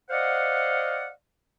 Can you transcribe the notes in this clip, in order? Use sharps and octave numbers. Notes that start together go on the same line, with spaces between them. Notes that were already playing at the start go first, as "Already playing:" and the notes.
C5 D5 D#5 F5 F#5